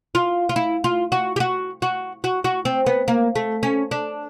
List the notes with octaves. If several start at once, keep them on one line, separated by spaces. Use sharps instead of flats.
F4
F4
E4
F4
F#4
G4
F#4
F#4
F#4
F#4
C4
B3
A#3
A3
C#4
D4